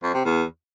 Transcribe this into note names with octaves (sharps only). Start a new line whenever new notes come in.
F2
C3
E2